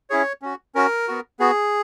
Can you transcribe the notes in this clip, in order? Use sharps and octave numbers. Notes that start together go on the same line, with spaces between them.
C#4 E4 G#4 C#5
C#4 F#4
C#4 F#4 A#4
B3 F#4
B3 F#4 G#4